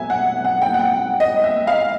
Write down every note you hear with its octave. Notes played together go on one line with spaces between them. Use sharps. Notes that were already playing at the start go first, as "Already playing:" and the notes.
Already playing: B2 F#3 A3 C#4 E5 G#5
F#5
F#5
G5
F#5
G5
D#5
E5
F5